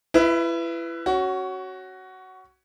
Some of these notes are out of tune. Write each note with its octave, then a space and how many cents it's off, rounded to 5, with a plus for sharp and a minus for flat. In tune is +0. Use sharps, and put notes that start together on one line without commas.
E4 +30 B4 +10 E5 -35
C#4 -5 F#4 +15